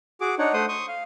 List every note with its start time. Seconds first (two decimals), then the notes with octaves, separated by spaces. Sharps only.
0.21 F#4 G#4 D6
0.39 D4 D#4 C#5 F#5
0.53 A3 C5 F#5 C6 D#6
0.69 C6 C#6 D#6
0.88 F5